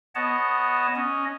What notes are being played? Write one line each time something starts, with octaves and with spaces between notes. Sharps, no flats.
B3 C#5 D#5 F#5 A5
C#4 D#5